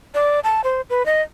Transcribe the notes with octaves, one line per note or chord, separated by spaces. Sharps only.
D5
A5
C5
B4
D#5